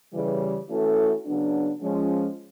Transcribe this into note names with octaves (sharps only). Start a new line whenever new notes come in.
C#3 E3 G3
E3 A3 C#4 F#4 A4
C#3 F#3 B3 D4
F3 G#3 C#4